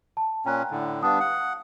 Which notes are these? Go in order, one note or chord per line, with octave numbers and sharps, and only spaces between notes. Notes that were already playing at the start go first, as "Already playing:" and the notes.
A5
A#2 C#4 G5 A#5 F#6
A2 D3
G3 B3 D4 F5 D#6
F#5